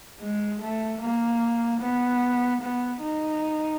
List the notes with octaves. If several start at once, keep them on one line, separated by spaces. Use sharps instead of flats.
G#3
A3
A#3
B3
B3
D#4